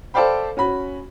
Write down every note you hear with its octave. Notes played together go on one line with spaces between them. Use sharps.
A4 C5 D5 F5 G5 B5
C#4 F#4 B5